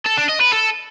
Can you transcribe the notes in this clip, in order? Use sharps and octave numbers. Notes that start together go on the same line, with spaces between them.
A4
D4
D#5
B4
A4